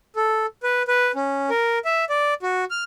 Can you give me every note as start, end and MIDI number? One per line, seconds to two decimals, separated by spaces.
0.16 0.46 69
0.63 0.83 71
0.88 1.12 71
1.15 1.50 61
1.50 1.79 70
1.85 2.05 76
2.10 2.34 74
2.43 2.65 66
2.71 2.84 89